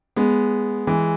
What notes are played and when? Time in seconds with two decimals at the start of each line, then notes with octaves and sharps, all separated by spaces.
0.16 G#3 B3
0.87 E3 G#3